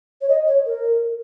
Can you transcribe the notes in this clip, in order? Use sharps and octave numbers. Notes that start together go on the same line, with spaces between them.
C#5
D#5
C#5
A#4